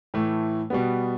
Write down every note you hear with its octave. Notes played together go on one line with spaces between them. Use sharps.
A2 E3 A3
B2 G3 B3